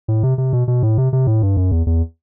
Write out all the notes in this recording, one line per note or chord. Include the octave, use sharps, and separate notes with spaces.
A2
C3
C3
B2
B2
A2
C3
C3
A2
G2
F#2
E2
E2